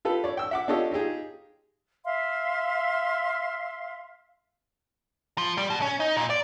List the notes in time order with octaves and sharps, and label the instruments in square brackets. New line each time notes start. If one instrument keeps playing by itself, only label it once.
[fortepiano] F4 G4 A4 B4
C#5 D5
G5 E6
E5 F#5 D6
D4 F4 G4 A4 C#5 D#5
D#4 F4 G4 G#4
[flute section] E5 F5 C6
[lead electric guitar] F3
G3
B2
C#4
D#4
A#2
D5